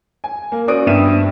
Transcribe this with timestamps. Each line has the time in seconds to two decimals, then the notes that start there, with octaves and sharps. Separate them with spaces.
0.24 G#5
0.52 A#3
0.67 C#4 F#4 C5 D5 D#6 D7
0.86 G2 B3 E5 D#7 E7